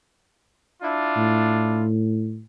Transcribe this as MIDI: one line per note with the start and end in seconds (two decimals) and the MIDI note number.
0.83 1.86 62
0.83 1.86 64
0.83 1.86 65
1.17 2.42 45